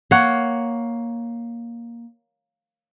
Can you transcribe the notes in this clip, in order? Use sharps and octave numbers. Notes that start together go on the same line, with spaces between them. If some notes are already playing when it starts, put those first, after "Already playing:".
A#3 C#5 F#5